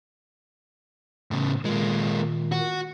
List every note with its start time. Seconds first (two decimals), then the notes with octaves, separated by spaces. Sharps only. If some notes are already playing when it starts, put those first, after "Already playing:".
1.31 A2 C#3
1.65 A#2 D#3 G#3 A#3
2.52 F#4